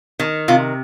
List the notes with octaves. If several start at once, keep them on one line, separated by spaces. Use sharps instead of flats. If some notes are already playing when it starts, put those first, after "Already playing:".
D#3
C3 F4